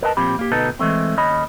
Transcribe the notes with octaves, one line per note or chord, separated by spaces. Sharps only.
A#4 B4 D#5 F#5 A5
A#2 F3 C4 G4 B5
A#3 G4
D2 B2 D#4 A4 B4
E3 G#3 A3 C4
D#2 C#4 D#5 B5